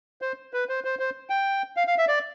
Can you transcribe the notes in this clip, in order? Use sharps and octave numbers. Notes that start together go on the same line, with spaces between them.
C5
B4
C5
C5
C5
G5
F5
F5
E5
D5